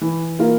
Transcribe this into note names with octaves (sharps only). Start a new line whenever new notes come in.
E3
A#3 F4 A#4